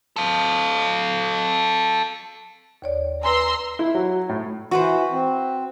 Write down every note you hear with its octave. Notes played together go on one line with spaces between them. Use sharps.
A4 F5
D#2 C#5 D5
B4 G#5 A#5 C6 E6
E4
F#3
A2
E3 F#4 B4 C5
C4